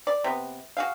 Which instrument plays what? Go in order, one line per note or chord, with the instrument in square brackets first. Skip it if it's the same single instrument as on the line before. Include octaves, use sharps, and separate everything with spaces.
[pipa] D5
C3 B3
F#4 G#4 F5